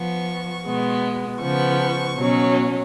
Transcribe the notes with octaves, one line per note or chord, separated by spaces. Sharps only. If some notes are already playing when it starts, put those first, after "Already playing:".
Already playing: F3 B3 C#6
B2 G#3 B3
C#3 F3 B3 C#6
B2 F#3 C#4